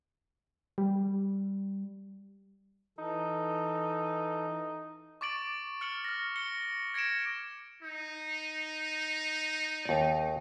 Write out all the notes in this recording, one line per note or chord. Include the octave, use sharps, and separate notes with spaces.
G3
E3 D#4 A4
C#6 D6 A6 D7 F#7
F6 C#7 F#7
F6 A#6
C#7 G7
G#6 A#6 C#7 D7 E7
D#4
D#2 D5